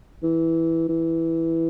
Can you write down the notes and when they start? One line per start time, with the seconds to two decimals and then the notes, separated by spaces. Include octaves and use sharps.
0.23 E3
0.89 E3